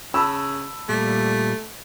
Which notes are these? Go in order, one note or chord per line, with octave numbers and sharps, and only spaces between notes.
C#3 A5 B5 E6
A#2 G3 A3